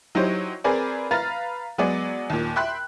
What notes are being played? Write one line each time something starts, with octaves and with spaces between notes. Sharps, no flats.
F#3 D#4 E4 G4 C5 C#5
C4 G#4 A#4 B4 D5 G#5
B4 F5 A#5 F6 A6
F#3 G#3 B3 G#4 D5
D#2 A#2
E5 G5 B5 C6 F#6